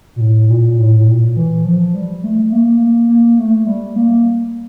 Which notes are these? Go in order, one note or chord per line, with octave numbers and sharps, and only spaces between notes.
A#2
A2
A#2
A2
A#2
E3
F3
G3
A3
A#3
A#3
A#3
A3
G3
A#3